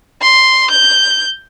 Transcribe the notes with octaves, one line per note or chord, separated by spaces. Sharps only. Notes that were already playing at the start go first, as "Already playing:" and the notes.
C6
G6